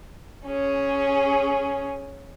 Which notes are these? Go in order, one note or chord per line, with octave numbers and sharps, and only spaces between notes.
C#4 G#4